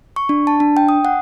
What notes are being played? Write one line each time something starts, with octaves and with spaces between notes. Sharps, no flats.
C#6
D4
A5
D4
G5
D#6
F#5